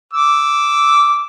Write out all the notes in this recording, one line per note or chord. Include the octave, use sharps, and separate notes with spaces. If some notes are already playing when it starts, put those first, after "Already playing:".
D6 E6